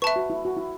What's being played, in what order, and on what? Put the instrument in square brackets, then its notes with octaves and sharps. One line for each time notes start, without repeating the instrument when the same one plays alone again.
[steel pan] B4 [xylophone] E5 A5 C#6
[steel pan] F#4
E4
F#4
E4